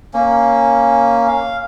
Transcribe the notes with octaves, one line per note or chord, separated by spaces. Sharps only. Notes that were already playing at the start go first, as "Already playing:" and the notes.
A#3 C#4
F5